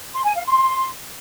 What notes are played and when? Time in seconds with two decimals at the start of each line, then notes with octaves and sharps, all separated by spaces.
0.15 C6
0.25 G#5
0.35 F5
0.45 C6